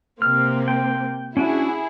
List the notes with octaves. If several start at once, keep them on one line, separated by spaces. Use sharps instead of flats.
C3 A#3 C4 F6
G5
C#4 D4 E4 F#4 G#4